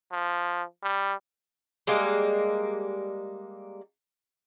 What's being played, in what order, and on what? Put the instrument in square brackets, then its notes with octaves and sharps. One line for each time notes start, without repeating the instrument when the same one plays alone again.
[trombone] F3
G3
[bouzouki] G3 G#3 A#3